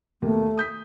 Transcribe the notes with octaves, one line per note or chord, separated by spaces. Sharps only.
D#2 B2 A3 A#3
D#6 G6 B6